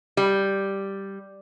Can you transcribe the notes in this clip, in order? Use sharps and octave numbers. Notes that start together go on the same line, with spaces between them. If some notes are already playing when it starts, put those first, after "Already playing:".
G3